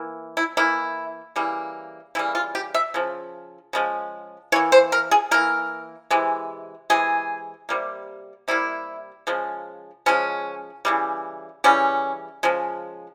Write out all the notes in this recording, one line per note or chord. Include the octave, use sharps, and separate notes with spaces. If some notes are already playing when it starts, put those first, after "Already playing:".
Already playing: E3 A#3
E4
E3 A#3 E4
C#3 E3 G3 A#3
C#3 E3 G3 A#3 E4
F4
G4
E5
C#3 F3
C#3 F3 G#3
E3 A#3 C#5
C5
A#4
G#4
E3 A#3 A#4
C3 E3 G#3
C3 E3 G#3 G#4
C3 G3 A#3
C3 G3 A#3 E4
C#3 F3 G#3
C#3 F3 G#3 C#4
C#3 E3 G3
C#3 E3 G3 C#4
C#3 F3 G#3